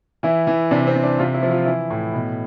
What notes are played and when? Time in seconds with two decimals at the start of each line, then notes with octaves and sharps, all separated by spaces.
0.23 E3 E4
0.47 E3
0.71 C3 D4
0.87 C4
0.95 C3
1.03 D4
1.19 C3 F4
1.34 E4
1.42 F3
1.50 F4
1.66 E3 E4
1.90 A2
2.14 B2